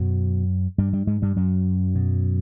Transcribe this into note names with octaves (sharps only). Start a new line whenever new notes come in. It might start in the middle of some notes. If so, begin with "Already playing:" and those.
Already playing: F#2 B2 F#3
G2 G3
G2 G3
G#2 G#3
G2 G3
F#2 F#3
B2